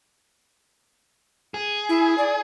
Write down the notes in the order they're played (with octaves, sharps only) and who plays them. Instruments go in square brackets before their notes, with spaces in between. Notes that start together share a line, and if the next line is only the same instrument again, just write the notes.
[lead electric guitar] G#4
[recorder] E4
D5